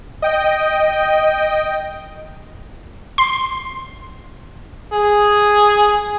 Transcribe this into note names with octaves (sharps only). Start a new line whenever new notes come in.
D#5 G5
C6
G#4